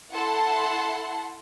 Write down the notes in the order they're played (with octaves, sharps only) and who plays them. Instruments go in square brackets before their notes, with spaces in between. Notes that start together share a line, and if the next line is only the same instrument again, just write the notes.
[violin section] E4 A4 F#5 A5 C6